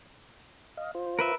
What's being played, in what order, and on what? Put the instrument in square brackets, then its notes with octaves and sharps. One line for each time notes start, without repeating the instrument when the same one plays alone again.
[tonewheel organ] D#5 F5
F4 C5
[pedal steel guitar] A#4 B4 E5